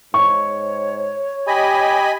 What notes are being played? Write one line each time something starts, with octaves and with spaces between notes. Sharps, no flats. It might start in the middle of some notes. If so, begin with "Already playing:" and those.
G#2 C#5 C#6
G4 D#5 G#5 B5